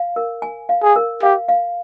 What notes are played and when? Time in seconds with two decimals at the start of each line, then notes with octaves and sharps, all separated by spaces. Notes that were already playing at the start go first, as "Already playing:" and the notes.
Already playing: F5
0.16 A#4
0.42 G#5
0.69 F5
0.82 G#4
0.96 A#4
1.22 G4 F5
1.49 F5